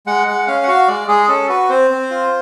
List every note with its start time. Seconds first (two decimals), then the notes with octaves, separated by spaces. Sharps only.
0.07 G#3 F#5
0.27 G#3 F#5
0.47 C#4 F5
0.63 F#5
0.67 F#4 F5
0.88 G#3 D5
1.08 G#3 G#4
1.28 C#4 A4
1.49 F#4 B4
1.70 C4 C5
1.91 C4
2.10 F4